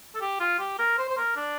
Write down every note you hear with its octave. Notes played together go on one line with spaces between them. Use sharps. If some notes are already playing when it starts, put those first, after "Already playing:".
A4
G4
F4
G4
A#4
C5
C5
A#4
D4